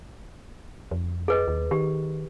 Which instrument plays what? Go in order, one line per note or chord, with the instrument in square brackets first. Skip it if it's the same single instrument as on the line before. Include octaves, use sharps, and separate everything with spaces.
[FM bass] F2
[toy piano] G#4 B4 D#5
[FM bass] D#2
[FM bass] D#3 [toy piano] G4